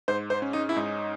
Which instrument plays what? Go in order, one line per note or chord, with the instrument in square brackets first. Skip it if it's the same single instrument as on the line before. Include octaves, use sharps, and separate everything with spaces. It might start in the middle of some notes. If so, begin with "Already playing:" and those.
[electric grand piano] G#2 [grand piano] C5
[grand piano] C5
[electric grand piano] C#4
[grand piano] D#4
E4
[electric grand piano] G#2 [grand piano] D#4